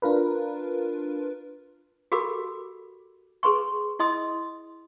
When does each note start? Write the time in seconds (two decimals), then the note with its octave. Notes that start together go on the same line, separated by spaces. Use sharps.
0.02 D4 F4 A#4 B4
2.12 F#4 G4 A4 A#4 B5 D6
3.43 G#4 B4 C6 C#6
3.99 E4 D#5 C6 D#6